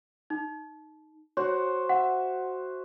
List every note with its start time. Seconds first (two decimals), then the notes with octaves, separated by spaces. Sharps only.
0.30 D#4
1.37 F#4 C5 C#5
1.89 E5 F#5